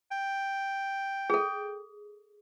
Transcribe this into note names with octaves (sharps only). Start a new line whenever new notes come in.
G5
G#4 A4